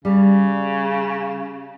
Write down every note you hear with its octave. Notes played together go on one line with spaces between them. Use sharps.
C#3 G3